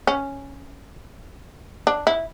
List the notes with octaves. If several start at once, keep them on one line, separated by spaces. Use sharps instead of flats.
C#4
D4
E4